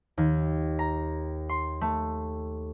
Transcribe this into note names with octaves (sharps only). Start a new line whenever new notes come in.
D#2
A#5
C6
A3